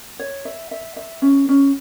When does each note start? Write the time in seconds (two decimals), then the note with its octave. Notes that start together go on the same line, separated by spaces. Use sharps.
0.19 C#5
0.45 E5
0.71 E5
0.96 E5
1.22 C#4
1.49 C#4